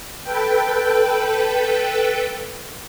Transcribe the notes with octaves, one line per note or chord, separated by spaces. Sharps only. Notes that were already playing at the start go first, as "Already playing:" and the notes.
A4 B4 G5